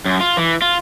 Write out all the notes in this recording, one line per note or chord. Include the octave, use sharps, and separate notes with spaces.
F#2
F4
E3
F4